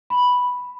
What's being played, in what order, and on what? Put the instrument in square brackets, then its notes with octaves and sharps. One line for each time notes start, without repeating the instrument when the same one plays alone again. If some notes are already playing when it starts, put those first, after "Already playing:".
[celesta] B5